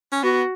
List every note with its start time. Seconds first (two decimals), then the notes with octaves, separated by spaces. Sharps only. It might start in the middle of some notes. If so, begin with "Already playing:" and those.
0.12 C#4
0.23 B3 F#4